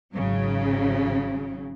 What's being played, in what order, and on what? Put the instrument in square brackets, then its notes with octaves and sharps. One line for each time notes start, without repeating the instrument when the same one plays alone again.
[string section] G#1 C#3 F#3